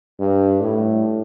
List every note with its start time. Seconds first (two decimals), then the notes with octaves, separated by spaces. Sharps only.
0.20 G2
0.61 A2